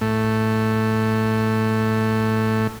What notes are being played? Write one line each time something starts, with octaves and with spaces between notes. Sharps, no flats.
A2 A3